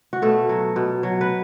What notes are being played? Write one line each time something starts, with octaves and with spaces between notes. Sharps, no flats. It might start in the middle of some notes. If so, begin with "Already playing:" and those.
F#4
B2 A3 A4
F#3
B2
F#3
B4